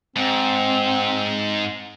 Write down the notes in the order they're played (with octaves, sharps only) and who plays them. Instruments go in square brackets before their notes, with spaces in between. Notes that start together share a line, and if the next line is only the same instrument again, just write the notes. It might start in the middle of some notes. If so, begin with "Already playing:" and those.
[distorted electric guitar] G#2 [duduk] C4